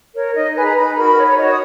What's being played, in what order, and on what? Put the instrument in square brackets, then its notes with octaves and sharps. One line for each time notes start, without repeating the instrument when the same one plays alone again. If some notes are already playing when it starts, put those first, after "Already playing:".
[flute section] A#4 C#5
D#4 D#5
G#4 B4 G#5
A#5
D#4 B5
F#4 A#4 B5
D#4 C#5
C#5
F#4 C#5 D#5
D#6